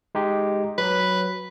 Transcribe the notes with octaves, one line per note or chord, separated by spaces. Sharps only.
G#3 D#4 G4
F#3 B4